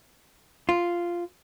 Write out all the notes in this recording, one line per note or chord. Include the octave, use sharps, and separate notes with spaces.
F4